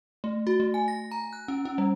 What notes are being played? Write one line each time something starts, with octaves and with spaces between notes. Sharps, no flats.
A3
F#4
A3
G#5
A#6
A#5
F#6
C#4
C#4
G3